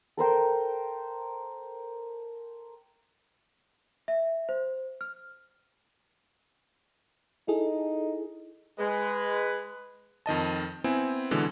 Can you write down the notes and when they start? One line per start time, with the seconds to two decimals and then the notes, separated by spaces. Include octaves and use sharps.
0.17 A4 A#4 C5 G5
4.08 E5
4.49 C5
5.01 F6
7.48 D#4 E4 G#4 A4
8.78 G#3 B4
10.26 F2 D#3 D#5 A5
10.84 B3 C4 E4 G#5
11.31 B2 D3 E3 G#3